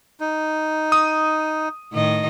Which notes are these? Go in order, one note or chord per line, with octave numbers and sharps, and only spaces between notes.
D#4
D#6
A2 D#3 D#5